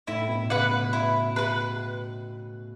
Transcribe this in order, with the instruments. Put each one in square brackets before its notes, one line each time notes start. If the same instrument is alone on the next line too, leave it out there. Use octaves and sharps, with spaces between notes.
[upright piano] A2 [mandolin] E4
[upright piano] A2
B2
[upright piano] C#3 [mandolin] B4 F#5
[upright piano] C#3
[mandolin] E4
B4 F#5